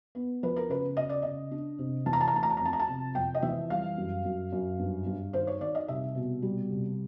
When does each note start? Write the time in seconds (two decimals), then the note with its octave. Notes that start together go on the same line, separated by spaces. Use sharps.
0.15 B3
0.43 F3 B4
0.56 A#4
0.69 C#3 B4
0.97 C#3 D#5
1.09 D5
1.22 C#3 D#5
1.51 D4
1.79 C3
2.06 E3 A5
2.13 A#5
2.21 A5
2.28 A#5
2.33 A3 A5
2.43 A#5
2.50 A5
2.57 A#5
2.60 F2
2.65 A5
2.73 A#5
2.79 A5
2.88 C3
3.15 F2 G5
3.34 D#5
3.42 E3 E5
3.70 G3 F5
3.97 F#2
4.25 F#2
4.52 F#2
4.79 G2
5.06 G2
5.33 D#3 C5
5.47 C#5
5.61 D#3 D5
5.75 D#5
5.88 C2 E5
6.15 B2
6.42 G3
6.70 C2